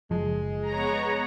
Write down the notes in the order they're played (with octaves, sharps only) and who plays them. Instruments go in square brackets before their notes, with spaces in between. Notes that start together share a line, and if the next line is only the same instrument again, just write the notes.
[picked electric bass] F#1 F3 [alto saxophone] G#3
[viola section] B3 C#5 A#5